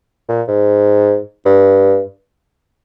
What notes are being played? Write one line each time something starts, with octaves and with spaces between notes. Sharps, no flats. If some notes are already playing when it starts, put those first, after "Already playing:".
A#2
G#2
G2